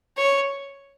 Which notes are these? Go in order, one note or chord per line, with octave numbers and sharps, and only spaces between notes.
C#5